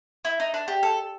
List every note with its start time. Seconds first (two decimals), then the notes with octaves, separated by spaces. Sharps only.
0.25 E4
0.40 D#4
0.54 D4
0.68 G4
0.83 A4